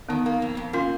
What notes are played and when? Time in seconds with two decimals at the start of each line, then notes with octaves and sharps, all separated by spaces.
0.09 D#3 B3 D#4
0.26 A#3
0.42 F2
0.57 F2
0.73 A#3 C#4 F4